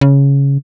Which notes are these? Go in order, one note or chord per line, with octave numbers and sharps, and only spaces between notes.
C#3